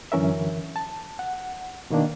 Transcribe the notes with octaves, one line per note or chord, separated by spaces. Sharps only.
F#2 D3 E3 C#4 A#4 E5
A5
F#5
B2 D#3 A#3 D4